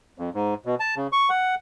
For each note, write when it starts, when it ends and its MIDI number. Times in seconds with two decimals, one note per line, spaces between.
0.18 0.30 41
0.34 0.54 44
0.66 0.75 47
0.80 0.95 81
0.97 1.07 49
1.12 1.29 85
1.30 1.55 78